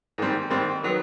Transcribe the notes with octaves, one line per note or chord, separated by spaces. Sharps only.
G#2 D#3 G3 C4
G#2 D#3 G3 C4
D#3 F#3 B3